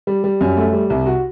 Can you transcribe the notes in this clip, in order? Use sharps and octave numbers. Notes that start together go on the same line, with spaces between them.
G3
G3
F#2
A3
G3
C2
F#4